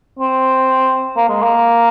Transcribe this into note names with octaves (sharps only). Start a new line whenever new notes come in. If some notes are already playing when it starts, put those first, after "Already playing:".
C4
A#3
G#3
A#3